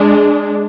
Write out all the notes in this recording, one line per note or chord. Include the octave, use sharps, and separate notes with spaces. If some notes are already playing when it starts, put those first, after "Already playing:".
Already playing: G#3 D4